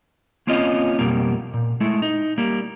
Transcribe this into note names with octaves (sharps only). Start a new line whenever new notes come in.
A#3 C4 C#4 F4 D#5
B1 F2 B2 G3 A#3
A#2
G#3 A3 E4
D#4
G3 A#3